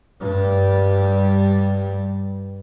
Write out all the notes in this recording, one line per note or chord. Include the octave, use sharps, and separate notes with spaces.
G2 G3